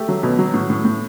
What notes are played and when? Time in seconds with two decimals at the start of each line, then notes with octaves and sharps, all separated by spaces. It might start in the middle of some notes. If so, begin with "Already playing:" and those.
Already playing: A3 G4
0.09 F#3
0.23 B2
0.39 F#3
0.54 A2
0.70 A2
0.85 A2